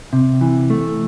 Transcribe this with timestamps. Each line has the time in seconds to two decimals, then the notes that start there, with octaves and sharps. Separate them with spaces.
0.13 C3
0.41 E3
0.70 A3